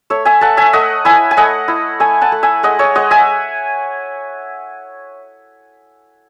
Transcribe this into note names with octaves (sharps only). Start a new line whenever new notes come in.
A3 C#5 E5
E5 G#5
A3 F#5 A5
E5 G#5
A3 D#5 F#5
E4 E5 G#5
G#5
A3 D#5 F#5
E4
A3 E5 G#5
F#5 A5
A3
E5 G#5
G#3 D#5 F#5
C#5 E5
G#3 D#5 F#5
E5 G#5